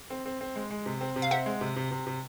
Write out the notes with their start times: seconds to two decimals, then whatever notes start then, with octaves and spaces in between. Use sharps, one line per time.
0.10 C4
0.26 C4
0.41 C4
0.56 G#3
0.71 G#3
0.86 C3
1.01 C4
1.16 C3
1.22 F5
1.31 C4 E5 F#5
1.46 G#3
1.61 C3
1.76 C3
1.91 C3
2.07 C3